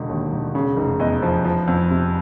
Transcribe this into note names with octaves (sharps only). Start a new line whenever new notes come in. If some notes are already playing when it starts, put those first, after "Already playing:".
Already playing: E1 D3
D#2
E1
C#3
F1
E2 D#5
F3
F3
F2
C3